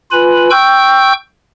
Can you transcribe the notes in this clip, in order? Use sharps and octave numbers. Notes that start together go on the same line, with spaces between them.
F4 B4 G#5 B5
G5 C#6 E6 G6